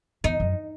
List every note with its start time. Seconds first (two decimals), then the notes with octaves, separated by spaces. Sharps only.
0.24 E2 D#4
0.40 F#2